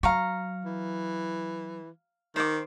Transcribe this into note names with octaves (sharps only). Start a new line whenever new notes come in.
F#3 F5 A#5 C#6
E3
D#3 C5 D6